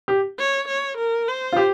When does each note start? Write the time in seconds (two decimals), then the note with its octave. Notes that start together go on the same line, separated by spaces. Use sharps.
0.08 G4
0.38 C#5
0.68 C#5
0.97 A#4
1.27 C5
1.52 F4
1.57 G4